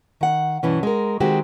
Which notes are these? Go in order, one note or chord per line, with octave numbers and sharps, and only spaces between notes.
D#3 F#5
G2 B2 E3 C#4
G#3 A#4
D#3 G#3 C4 F#4 G4